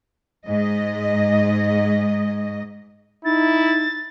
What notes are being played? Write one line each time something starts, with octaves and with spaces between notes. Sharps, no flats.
G#2 D#5
D#4 E4 A6